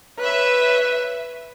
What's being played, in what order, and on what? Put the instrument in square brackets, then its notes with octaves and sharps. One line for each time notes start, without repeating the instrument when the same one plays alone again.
[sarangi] B4 [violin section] C#5 E5